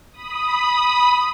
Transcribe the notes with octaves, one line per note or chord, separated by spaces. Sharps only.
B5 D#6